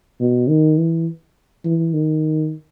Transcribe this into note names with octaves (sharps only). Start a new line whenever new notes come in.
B2
D#3
E3
E3
D#3